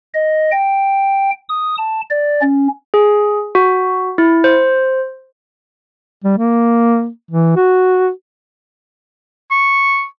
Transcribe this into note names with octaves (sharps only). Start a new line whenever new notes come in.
D#5
G5
D#6
A5
D5
C#4
G#4
F#4
E4
C5
G3
A#3
E3
F#4
C#6